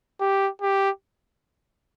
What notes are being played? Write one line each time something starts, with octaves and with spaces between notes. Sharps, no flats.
G4
G4